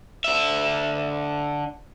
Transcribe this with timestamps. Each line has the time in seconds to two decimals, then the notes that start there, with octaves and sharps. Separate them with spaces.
0.24 D3 E5